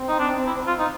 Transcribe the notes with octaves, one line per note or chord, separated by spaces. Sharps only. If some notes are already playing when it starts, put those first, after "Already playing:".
Already playing: C4
D#4
D4
E4
F4
D#4